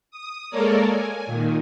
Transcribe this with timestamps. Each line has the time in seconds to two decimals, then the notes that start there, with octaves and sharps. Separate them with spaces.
0.11 D#6
0.50 G#3 A#3 A4 A#4 C#5 D5
0.87 G#5
1.26 A#2 D#3